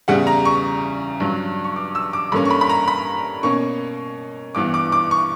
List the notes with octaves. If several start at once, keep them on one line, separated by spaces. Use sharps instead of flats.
E2 C#3 G3 F#5
A#5
C#6
G2 F#3 C#4
C#6
D6
E6
D6
G2 D3 A#3 C#4 B5
C#6
B5
B5
A#5
B5
B2 A#3 C#4 C#6
G2 E3 B3 D6
D6
D6
C#6